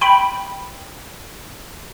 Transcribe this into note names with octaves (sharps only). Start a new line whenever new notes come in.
G5 B5